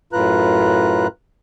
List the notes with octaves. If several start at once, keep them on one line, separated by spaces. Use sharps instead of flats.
F#2 A2 F4 B4 A#5 F#6